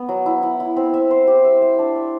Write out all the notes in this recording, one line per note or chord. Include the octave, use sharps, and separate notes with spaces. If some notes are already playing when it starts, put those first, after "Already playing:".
Already playing: B3
F#3
E4
E4
E4
C4
E5
C5
G4
E5
E5
D4
D5